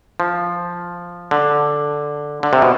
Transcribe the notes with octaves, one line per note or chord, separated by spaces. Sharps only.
F3
D3
D3
C3
B2